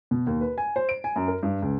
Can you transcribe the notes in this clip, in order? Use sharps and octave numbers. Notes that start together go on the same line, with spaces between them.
B2
D#2
B4
G#5
C5
D7
G#5
F#2
A#4
G2
C#2